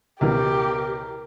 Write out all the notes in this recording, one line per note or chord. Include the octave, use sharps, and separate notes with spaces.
C#2 B2 E3 G4 A#4